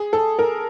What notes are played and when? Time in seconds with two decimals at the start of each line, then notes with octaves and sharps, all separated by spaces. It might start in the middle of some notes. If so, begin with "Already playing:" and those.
Already playing: G#4
0.13 A4
0.39 A#4